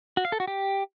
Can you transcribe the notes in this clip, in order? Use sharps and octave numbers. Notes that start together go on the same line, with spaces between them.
F#4
F5
A4
F#4
G4